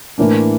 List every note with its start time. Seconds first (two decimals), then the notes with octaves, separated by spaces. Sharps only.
0.18 A2 E3 A#3 D4